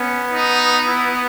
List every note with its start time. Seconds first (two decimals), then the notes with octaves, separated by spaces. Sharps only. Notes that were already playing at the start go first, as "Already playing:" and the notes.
Already playing: B3 C#4
0.31 D#4
0.88 E4